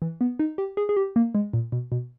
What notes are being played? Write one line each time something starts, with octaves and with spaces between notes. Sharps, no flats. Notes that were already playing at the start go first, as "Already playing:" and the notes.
E3
B3
D#4
G4
G#4
G#4
G4
A#3
G#3
A#2
B2
B2